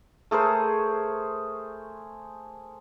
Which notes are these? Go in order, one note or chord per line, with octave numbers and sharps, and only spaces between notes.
A3 G#4 A#4 C5